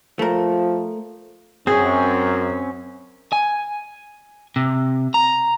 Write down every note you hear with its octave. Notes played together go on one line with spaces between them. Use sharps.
F3 A3 A#4
F#2 C4 C#4 G#4
G#5
C3
A#5